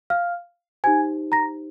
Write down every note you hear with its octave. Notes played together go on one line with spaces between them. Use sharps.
F5 F6
D#4 G4 C5 G#5 G#6
A#5 A#6